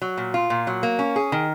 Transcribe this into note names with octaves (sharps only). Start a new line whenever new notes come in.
F#3
A#2
F4
A#2
F#3
A#3
C#4
G#4
D#3